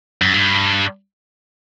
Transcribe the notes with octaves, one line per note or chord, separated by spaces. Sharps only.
F#2
G2